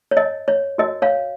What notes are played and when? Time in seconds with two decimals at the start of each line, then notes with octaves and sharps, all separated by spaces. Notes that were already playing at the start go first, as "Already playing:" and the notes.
0.11 C#5
0.17 D#5
0.48 C#5
0.78 F#4 A#4 C#5 D#5
1.02 C#5 F5